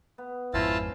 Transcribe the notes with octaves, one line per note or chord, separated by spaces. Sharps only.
B3
G#1 F2 G#2 C4 C#4 E4 F4 A5